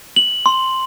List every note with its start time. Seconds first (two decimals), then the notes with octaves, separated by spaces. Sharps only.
0.16 F#7
0.46 C6